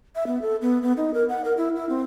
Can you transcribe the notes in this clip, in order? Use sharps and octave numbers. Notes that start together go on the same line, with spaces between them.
E5
B3
A4
B3
B3
D#4
A#4
F#5
A#4
E4
E4
C4